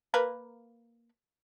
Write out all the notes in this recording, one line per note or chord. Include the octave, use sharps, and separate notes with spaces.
A#3 A#4 B4